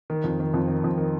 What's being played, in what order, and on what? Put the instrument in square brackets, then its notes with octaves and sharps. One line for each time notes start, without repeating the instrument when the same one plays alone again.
[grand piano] D#3
F2
D#3
F2
D#3
F2
D#3